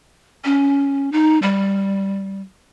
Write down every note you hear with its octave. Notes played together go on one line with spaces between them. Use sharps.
C#4
D#4
G3